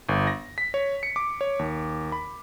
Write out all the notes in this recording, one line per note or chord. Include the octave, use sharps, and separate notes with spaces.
G1
A#6
B6
C#5
C#7
D6
C#5
D#2
B5